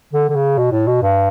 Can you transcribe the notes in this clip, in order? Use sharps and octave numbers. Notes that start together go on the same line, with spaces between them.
D3
D3
C#3
B2
A2
B2
G2